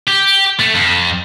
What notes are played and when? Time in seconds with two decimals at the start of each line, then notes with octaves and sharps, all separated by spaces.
0.07 G4
0.60 A3
0.75 F2